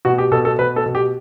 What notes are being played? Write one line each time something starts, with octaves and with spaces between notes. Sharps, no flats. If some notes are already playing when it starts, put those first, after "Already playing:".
B2 F#4
G4
B2 A4
A4
B2 B4
A4
B2
G4